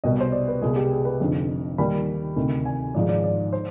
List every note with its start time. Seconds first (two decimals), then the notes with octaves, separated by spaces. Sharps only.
0.04 C2 B2 G3 D#5
0.21 C5
0.32 D5
0.48 B4
0.61 C2 B2 G#3 G#4
0.76 G4
0.91 G#4
1.05 B4
1.20 F1 F2 D3
1.78 D#2 D#3 G3 B5
2.36 D2 C3 D#3
2.65 G#5
2.94 G#1 G#2 F3 G#3 D5
3.09 D5
3.24 D5
3.53 C5